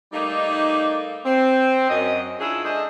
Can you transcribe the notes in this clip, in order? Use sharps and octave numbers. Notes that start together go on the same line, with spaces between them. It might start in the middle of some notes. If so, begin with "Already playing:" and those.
G3 A3 A#3 D#4
C4
F#2 D#5
C#4 D4 E4 F4 G#4
G#3 D4 G#4 A4 C5 D#5